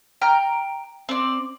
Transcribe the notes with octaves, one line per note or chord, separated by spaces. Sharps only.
G5 A#5 F6
C4 D5